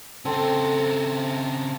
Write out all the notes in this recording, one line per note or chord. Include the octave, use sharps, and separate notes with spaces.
C#3 C4 A4 C5 G5